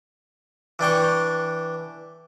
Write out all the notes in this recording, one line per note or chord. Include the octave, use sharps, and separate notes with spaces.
E3 D4 G5 C#6